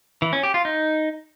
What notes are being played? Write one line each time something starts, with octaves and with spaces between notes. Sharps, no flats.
E3
C#4
G4
F4
D#4